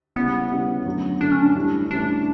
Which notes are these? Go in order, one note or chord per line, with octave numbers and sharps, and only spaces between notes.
C#3 G3 B3 C#4 E4
C#3 G3 C#4 E4
F#2 D3 F#3 A3
F#2 D3 F#3 A3 D4
C#4
D4
A2 E3 G3 C#4 E4
A2 E3 G3 C#4 D4 E4